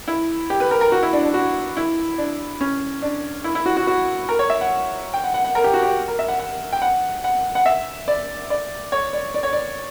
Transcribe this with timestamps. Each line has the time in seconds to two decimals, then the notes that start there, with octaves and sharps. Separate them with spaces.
0.08 E4
0.50 G4
0.60 B4
0.71 A#4
0.81 A#4
0.92 F#4
1.03 E4
1.13 D4
1.23 D4
1.34 F#4
1.77 E4
2.18 D4
2.61 C#4
3.02 D4
3.44 E4
3.55 E4
3.66 F#4
3.77 F#4
3.87 F#4
4.29 A#4
4.39 C#5
4.50 E5
4.61 F#5
5.14 G5
5.24 F#5
5.34 F#5
5.45 F#5
5.55 A#4
5.64 G4
5.74 F#4
5.83 G4
6.08 A#4
6.19 E5
6.28 F#5
6.39 F#5
6.73 G5
6.82 F#5
7.24 F#5
7.55 F#5
7.66 E5
8.08 D5
8.50 D5
8.92 C#5
9.13 D5
9.34 D5
9.43 C#5
9.53 D5